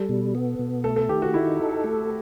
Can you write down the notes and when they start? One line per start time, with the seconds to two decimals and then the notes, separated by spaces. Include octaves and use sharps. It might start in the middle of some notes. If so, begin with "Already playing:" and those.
Already playing: G3 A4
0.09 B2
0.35 B3
0.59 B2
0.84 A3 A4
0.96 A4
1.09 D#3 G4
1.22 F#4
1.34 D#4 E4
1.60 A4
1.84 A3